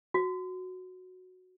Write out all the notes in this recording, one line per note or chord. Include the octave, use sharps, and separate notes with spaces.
F#4